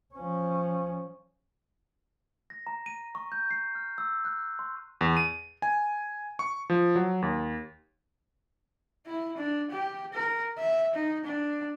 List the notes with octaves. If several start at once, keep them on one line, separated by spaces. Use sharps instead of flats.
F3 C#4
A#6
A#5
D#7
C#6
G6
C7
F6
E6
F#6
C6
E2
D#7
G#5
C#6
F3
F#3
D#2
E4
D4
G4
A#4
E5
D#4
D4